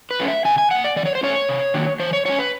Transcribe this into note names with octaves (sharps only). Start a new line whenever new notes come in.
B4
F#3 A3 C#4
E5
C3 G#5
G#5
F3 A#3 F#5
D5
E3 D5
C#5
C5
A3 C#4 C#5
C3
D#3 F#3 A#3 D4
E3 C5
C#5
G#3 C#4 C#5
B4